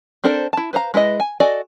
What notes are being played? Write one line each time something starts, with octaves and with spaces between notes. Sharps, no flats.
C4 D4 A4 A#4 C5
E4 A5
B4 C5 F5 A#5
G#3 E4 B4 D#5
G#5
F#4 A4 D5 D#5 G#5